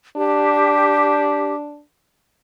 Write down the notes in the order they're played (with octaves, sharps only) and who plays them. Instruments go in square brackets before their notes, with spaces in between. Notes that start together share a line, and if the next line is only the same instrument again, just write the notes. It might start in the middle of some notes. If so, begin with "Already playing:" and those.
[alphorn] D4 [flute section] G4